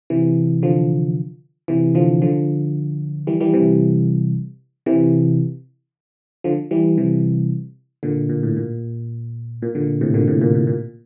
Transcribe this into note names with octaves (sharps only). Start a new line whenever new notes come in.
C3 E3
D3 F3
C3 E3
D3 F3
D3 F3
E3 G3
E3 G3
C3 E3
C3 E3
D3 F3
E3 G3
C3 E3
A#2 D3
A#2
A2
A#2
A#2
A#2 D3
A2 C3
A#2 D3
A2 C3
A#2
A2
A#2